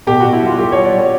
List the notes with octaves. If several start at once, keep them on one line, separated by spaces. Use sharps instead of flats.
B2 G4
F#4
B2
E4
G3 F4
G3 G4
C#5
G3
D5
G3 C#5